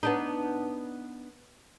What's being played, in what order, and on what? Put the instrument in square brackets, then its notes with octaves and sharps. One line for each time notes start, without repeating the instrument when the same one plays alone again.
[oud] B3 D4 D#4